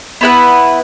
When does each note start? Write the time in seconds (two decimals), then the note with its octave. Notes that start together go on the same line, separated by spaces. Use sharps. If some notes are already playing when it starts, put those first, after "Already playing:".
0.21 B3 E4 B4 F#5